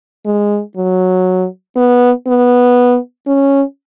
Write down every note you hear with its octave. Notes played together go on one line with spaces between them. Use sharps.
G#3
F#3
B3
B3
C#4